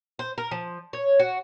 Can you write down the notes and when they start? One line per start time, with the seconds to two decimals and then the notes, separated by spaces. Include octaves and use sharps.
0.19 C5
0.38 A#4
0.51 F3
0.93 C#5
1.19 F#4